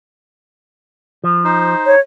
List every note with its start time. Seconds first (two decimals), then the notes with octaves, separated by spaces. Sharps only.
1.24 F3
1.45 D#4 C5
1.86 C#5